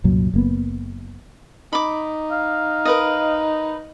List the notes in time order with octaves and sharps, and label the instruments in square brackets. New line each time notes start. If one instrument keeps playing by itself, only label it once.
[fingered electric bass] C2 F#2 A#2 F#3
F#1 A#3 B3
[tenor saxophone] D#4 [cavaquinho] B5 D6
[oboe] F5
[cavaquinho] A#4 B4 D#5